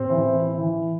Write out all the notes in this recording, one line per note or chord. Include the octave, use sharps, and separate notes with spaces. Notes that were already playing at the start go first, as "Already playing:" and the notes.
Already playing: A2 C4
E3
E4
E4
E3